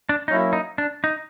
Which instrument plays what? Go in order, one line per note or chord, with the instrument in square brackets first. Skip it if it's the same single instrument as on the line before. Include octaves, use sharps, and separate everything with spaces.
[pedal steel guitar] D4
[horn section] F#3 A#3 C#4 E4 [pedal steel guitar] D#4
[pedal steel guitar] D#4
D4
D#4